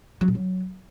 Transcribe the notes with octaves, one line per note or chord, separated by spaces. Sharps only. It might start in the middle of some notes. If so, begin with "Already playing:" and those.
F#3
A#2
F#3